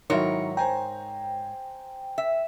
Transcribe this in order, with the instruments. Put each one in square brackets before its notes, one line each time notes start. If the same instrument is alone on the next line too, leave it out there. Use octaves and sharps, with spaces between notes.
[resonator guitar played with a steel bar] G#2 A#4 C#5 [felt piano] D#3 F#3 E4
[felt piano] C5 G#5 A#5 [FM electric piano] G5
[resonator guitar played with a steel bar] E5